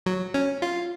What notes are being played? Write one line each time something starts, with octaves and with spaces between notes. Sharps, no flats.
F#3
C#4
F4